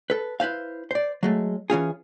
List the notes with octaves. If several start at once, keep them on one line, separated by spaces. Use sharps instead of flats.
A4 B4
E4 B4 C5 F5
C5 D5
F#3 G#3 A3
E3 C#4 F4 G#4